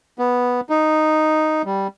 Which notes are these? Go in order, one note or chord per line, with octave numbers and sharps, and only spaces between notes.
B3
D#4
G3